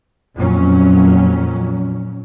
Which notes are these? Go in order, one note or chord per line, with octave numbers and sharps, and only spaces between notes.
F2 A#2 F#3 C#4